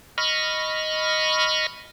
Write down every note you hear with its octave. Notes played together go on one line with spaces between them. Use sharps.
D#5 B5 C#6 F6